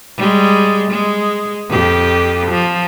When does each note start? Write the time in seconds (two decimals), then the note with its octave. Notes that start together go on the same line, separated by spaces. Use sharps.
0.17 G3 G#3
0.91 G#3
1.70 F2 G4
2.51 F3